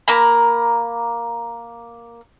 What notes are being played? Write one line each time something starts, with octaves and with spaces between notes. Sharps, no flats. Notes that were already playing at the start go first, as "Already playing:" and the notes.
A#3 A#5 B5